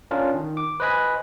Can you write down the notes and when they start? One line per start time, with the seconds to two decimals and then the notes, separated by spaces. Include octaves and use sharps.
0.11 C#4 D4 F4 A#4
0.34 D#3
0.57 D6
0.80 B4 C5 D#5 G#5 B5